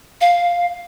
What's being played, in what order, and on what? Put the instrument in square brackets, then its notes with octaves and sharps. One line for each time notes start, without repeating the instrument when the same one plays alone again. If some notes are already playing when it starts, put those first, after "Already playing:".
[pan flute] F5